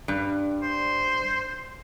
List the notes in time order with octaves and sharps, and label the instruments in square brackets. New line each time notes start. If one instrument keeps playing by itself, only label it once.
[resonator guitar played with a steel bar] G2
[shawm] C5